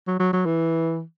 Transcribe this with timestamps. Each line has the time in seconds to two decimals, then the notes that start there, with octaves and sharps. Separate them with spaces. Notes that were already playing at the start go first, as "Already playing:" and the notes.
0.07 F#3
0.20 F#3
0.33 F#3
0.46 E3